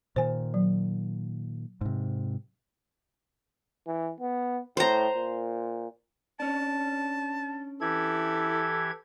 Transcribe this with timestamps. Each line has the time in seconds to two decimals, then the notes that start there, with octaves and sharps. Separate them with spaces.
0.16 A#2 D#3 C5 G#5
0.54 F#3
1.81 G#2 C3
3.87 E3
4.20 B3
4.77 A2 C5 A#5
5.16 A#2
6.40 C#4 D4 A5
7.81 E3 E4 G4 A4 G#6